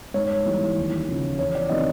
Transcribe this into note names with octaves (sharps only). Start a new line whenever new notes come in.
G#2 C#5
E3 G3
D#2
C#3 F3
E2 C#5
D5
C3 D#3 F#3 D#5